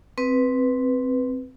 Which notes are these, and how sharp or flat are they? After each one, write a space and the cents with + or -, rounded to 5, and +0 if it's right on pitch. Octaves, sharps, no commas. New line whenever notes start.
C4 +0 B4 +0